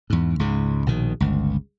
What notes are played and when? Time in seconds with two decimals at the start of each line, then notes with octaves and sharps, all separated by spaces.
0.10 E2 G#2
0.39 C#2 G#2 C#3
0.86 A#1 B2 D#3
1.20 G1 C#2